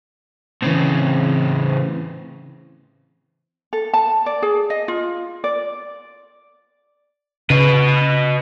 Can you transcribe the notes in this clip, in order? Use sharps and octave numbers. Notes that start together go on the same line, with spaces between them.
A2 C#3 E3 C4
A4
A5
D5
G#4
D#5
F4
D5
C#3 B4 D#5